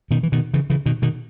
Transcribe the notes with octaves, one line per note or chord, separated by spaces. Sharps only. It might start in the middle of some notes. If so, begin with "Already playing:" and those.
B2 D#3
E3
B2 D#3
C#3 E3
C#3 E3
B2 D#3
B2 D#3